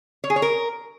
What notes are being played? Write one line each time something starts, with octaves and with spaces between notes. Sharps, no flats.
C#5
G#4
C#5
A#4